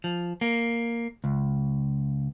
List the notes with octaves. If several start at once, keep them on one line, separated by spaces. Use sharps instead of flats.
F3
A#3
C#2